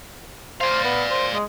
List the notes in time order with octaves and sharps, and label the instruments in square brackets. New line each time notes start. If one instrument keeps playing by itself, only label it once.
[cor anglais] C5 [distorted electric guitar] D5 F5
[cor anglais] B3
C5
G#3